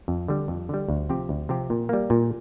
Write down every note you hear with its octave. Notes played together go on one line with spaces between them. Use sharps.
F2
D3 G3
F2
D3 G3
D2
C3 F3 C4 G4
D2
C3 F3 C4 G4
A#2
G3 A#3
A#2